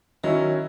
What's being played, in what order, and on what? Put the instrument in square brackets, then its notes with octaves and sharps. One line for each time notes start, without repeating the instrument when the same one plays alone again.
[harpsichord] D#3 [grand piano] F#3 C#4 E4